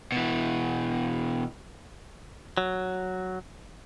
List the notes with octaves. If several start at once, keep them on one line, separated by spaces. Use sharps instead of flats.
B2 E3
F#3